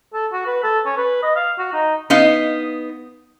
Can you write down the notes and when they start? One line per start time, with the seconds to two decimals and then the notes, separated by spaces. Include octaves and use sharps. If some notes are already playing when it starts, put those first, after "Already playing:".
0.14 A4
0.32 F#4
0.46 B4
0.63 A4
0.86 C#4
0.97 B4
1.23 D#5
1.36 F5
1.58 F#4
1.73 D#4
2.10 B3 D#4 F5